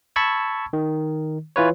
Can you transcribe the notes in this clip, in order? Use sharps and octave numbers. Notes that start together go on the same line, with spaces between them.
A5 B5 C#6 E6 G#6
D#3
E3 F4 B4 C#5